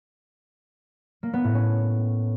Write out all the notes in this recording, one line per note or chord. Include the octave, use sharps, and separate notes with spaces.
A#3
B3
A2
C#4